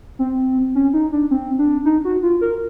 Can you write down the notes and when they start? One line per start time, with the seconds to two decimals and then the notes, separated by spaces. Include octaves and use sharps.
0.19 C4
0.75 C#4
0.93 D#4
1.12 D4
1.31 C4
1.58 D4
1.85 D#4
2.05 F#4
2.22 F4
2.41 A#4